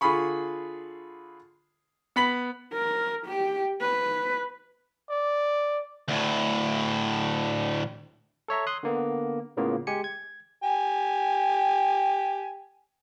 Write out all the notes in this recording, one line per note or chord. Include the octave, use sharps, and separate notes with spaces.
D3 F4 G#4 B5 C#6
B3 B5 B6 F#7
A#4
G4
B4
D5
D2 A2
A4 C#5 E5 A#5
C6 D#6 F#6
D3 A#3 B3
A2 C#3 A#3 B3 F4
G#3 G4 G#5 C#7
G#6
G4 G#5